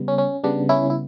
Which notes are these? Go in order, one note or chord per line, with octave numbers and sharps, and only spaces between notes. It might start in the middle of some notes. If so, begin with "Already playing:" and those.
Already playing: C#3 G3 B3
C#4
C#4
C#3 G3 B3 D4
C#4 E4
E4